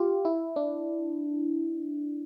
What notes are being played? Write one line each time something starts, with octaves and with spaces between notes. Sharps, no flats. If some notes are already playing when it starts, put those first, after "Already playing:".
Already playing: F4 G4
E4
D4